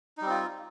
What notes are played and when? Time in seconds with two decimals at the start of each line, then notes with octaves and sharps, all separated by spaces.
0.18 D#4
0.22 G3
0.26 C4
0.30 F4